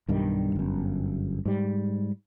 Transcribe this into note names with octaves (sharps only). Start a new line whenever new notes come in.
B1 G2 D#3 G3
G1 F#2
G#2 G3